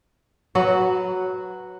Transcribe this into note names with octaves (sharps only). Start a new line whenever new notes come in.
F#3 F#4 B4